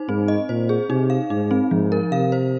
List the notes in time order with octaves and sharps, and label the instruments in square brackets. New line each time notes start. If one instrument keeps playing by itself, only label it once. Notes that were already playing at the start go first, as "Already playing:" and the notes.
Already playing: [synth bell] D#4 C5
[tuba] G#2 [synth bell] C4
[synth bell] D#5
[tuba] A#2 [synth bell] C5
[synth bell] G#4
[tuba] C3 [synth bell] D#4
[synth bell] F5
[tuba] G#2 [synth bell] D#4
[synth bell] C4
[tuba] G#2 [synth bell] F3
[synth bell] A#4
[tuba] C3 [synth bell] F5
[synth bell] C5